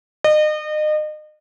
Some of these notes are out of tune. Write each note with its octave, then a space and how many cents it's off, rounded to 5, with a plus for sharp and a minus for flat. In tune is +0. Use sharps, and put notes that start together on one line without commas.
D#5 -35